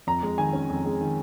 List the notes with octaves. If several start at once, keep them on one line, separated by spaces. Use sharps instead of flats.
F2 A#5
G#3
D#3 G#5
C#4
F2
G#3
D#3